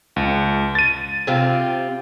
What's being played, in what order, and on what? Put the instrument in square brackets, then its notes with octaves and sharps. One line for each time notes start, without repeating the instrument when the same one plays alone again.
[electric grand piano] C#2
A6 D#7
[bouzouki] C3 C4 F4